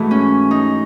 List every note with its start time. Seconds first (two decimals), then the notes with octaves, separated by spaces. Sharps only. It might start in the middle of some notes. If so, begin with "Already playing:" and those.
Already playing: G#2 E3 A3 F#4
0.11 C#4
0.51 D#4